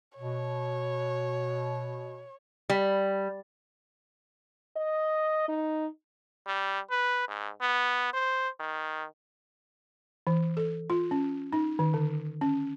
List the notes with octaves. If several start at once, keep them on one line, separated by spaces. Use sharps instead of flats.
B2 C#5
G3
D#5
D#4
G3
B4
G#2
B3
C5
D#3
E3
A4
F4
C#4
D#4
D#3
D3
C#4